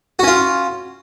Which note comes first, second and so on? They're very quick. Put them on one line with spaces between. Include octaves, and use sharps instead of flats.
F#4 C#4 F4